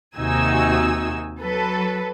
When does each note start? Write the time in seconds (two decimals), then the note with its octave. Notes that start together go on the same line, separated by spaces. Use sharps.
0.17 D#2 C3 D#4 F#4 G#5 E6
1.41 F#3 A4 B4